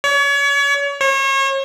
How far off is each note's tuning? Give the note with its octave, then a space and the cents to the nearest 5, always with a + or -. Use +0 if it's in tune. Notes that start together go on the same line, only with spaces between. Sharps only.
C#5 +35
C#5 -35